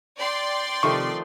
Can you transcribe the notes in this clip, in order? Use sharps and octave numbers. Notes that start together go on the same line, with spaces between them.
D5 G5 C6
C3 D#3 F3 A3 G4 A4 C#6